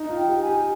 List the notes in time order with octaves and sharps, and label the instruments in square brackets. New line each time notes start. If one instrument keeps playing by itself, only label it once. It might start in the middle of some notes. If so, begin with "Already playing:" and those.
Already playing: [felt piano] D#4
F4
[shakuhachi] G5
[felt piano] G4
[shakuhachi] G#5
[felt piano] G4